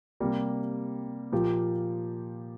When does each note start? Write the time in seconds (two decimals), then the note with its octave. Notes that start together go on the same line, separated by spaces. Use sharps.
0.20 C3 G3 A#3
1.32 A#2 F3 A#3 G4